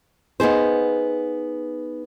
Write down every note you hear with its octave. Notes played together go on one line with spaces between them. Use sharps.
B3 D#4 G#4 C5